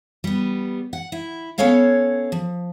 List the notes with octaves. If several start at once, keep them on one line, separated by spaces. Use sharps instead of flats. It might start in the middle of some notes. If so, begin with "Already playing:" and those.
G3 B3
F#5
E4
B3 C#4 A4 C#5 F5 F#5
F3